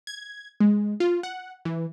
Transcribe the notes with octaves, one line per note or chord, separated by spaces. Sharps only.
G#6
G#3
F4
F#5
E3